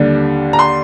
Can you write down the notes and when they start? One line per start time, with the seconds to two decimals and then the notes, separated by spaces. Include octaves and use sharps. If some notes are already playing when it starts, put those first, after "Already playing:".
Already playing: D#2 D3 G3 D4
0.53 A#5
0.59 C6